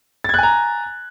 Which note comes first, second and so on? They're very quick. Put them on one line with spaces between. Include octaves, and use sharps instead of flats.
A6 G#6 F#6 G#5 A#5